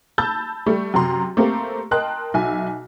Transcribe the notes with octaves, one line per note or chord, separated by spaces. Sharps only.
A5 B5 E6 G6 A6
G3 A3
F#2 C3 A#5 C6
A3 A#3 C4 G4
A#4 D#5 G5 A5 C6 F#6
B1 E5 G#5